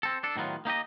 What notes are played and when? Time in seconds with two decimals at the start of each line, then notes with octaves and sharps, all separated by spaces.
0.03 C4 A4
0.23 D4 A4
0.36 A2 D#3 F#3 B3 F4
0.65 A#3 D#4 G4 D#5